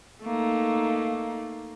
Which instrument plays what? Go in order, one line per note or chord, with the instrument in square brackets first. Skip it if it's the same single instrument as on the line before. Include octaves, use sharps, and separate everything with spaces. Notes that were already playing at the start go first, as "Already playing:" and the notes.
[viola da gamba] A3 A#3 D#4